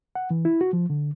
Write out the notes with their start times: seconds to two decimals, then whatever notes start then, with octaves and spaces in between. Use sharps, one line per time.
0.15 F#5
0.31 E3
0.45 E4
0.61 F#4
0.73 F3
0.90 D3